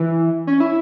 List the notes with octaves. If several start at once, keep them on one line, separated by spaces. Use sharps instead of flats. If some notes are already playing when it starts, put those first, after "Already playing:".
Already playing: E3
C#4
E4